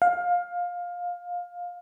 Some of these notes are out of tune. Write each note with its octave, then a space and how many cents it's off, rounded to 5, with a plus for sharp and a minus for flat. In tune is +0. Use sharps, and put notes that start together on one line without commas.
F5 +20